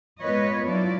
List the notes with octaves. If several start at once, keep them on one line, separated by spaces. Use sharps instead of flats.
G#3 B3 F4 B4 C#5 D#5
F#3 D4 E4 F4 D5